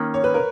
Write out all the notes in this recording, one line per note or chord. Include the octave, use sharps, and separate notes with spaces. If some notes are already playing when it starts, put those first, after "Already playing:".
Already playing: D#3 A#3 C#4
C#5
B4
A#4